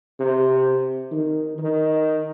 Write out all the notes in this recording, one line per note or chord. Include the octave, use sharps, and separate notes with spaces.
C3
D#3
D#3